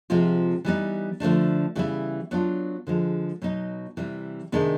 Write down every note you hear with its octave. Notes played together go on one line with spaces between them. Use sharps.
C3 F3 G#3 C4 F4
E3 G3 B3 D#4
D3 F3 A3 D4
C#3 E3 G3 B3 E4
F#3 B3 D4 F4
D3 F3 G#3
B2 F#3 B3 D#4
C3 E3 G3
C3 D#3 G#3 B3 D4